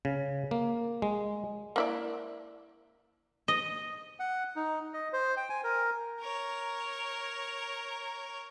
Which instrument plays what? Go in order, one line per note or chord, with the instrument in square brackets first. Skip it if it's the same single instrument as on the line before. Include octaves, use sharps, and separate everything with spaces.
[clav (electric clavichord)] C#3
A#3
G#3
[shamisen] A#3 E4 D5
[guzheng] D#5
[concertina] F#5
D#4
D#5
C5
G5
G#5
A#4
[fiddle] A#4 C#5